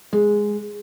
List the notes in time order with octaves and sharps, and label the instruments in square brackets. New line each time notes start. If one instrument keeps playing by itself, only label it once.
[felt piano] G#3